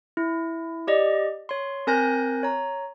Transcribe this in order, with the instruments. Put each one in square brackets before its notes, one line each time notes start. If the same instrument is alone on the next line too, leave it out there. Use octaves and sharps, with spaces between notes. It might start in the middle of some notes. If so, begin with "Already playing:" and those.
[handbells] E4
G4 D5 D#5
C#5 C6
C4 A#4 G#5 F#6 G6 A#6
C#5 A#5